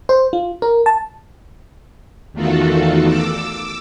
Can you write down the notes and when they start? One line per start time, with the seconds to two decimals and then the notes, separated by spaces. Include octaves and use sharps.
0.09 C5
0.33 F4
0.62 A#4
0.86 A5
2.33 E2 D#3 A3 F4 F#4 A4
3.06 D6 E6